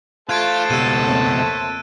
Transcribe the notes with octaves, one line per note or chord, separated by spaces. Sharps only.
A3 F4 C5 A5 F#6 G#6 D7
C#2 B2 G4 E6 D#7
F2 A#3 C#5